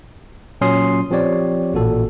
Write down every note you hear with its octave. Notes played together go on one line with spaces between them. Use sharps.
A#2 F#3 C#4 C6 D#6 C7
F3 C4 G4 C#5 D5
A1 A#2 F#4 A4